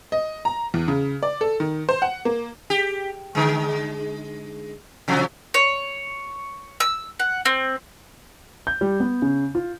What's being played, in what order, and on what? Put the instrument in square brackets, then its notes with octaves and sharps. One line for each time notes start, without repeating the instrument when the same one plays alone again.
[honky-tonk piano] D#5
A#5
E2
C#3
D5
A4
D#3
C5
F#5
A#3
[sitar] G4
D3 G#3
C3 F3 F#3
[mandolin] C#5
E6
F#5
C4
[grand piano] G6
G3
B3
C#3
F4